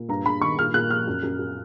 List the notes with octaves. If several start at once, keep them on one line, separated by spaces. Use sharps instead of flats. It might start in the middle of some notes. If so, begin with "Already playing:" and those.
Already playing: A#2
G2 A#5
G2 B5
D#3 C#6
A#2 F6
A#2 F#6
F3 F6
F#2
F#2
F#2